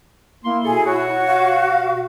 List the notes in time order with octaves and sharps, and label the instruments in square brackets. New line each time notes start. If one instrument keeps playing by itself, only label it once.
[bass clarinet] A#3 [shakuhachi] E4 [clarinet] C6
[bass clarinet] B2 [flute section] G#4 [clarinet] A4
[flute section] F#4 [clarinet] C#5
[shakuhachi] F5